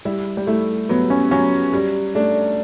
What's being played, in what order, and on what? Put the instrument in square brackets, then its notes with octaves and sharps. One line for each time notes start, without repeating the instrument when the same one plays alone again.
[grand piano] G3 [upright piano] E4
[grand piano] G3
[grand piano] A3 [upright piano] E4
[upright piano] F#3 [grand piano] B3
[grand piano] C#4
[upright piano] F#3 [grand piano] C#4
[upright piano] G3
[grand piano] A3 [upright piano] D4